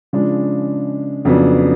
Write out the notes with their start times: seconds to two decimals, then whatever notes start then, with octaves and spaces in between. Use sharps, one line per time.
0.13 C#3 F3 G#3 D4
1.25 F2 C#3 F#3 B3 D4